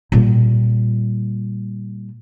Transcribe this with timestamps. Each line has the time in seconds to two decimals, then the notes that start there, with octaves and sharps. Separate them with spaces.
0.12 A#2 G3